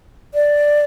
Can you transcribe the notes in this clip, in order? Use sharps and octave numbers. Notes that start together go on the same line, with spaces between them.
D5